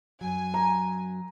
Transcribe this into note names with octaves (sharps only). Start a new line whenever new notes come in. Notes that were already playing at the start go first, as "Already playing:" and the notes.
F#2 F#3 G#5
A#5